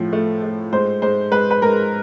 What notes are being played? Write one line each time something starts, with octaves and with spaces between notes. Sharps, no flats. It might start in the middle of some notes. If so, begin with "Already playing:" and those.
Already playing: A2 F3
A3
A3
G#2 C5
G#2 C5
G#2 B4
B4
G#2 A#4